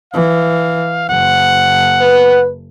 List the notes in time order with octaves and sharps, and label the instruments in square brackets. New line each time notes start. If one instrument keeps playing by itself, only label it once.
[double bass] E3 [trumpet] F5
[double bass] F#1 [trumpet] F#5
[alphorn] B4